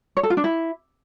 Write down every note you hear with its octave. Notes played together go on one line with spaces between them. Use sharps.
C#5
A4
F4
D4
E4